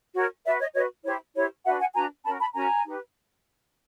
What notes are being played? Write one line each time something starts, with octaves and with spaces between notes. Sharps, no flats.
F#4 A#4 C#5
F#4 B4 D5 E5
C#5 D#5
F#4 B4 C#5 D#5
E4 G4 C5 C#5
E4 G4 C5 C#5
D4 F#4 B4 E5 F#5
F#5 G#5
D4 F#4 B4 G#5 A#5
C#4 F#4 A#4 A5 B5
A5 B5
C#4 F#4 A#4 G#5 A#5
D#4 G4 B4